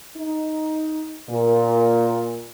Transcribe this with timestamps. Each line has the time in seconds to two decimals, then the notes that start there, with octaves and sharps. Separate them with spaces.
0.16 D#4
1.28 A#2